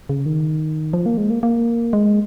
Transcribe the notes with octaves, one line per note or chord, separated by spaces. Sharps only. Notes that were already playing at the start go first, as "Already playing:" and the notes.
C#3
D#3
F3
A#3
G#3
A#3
A#3
G#3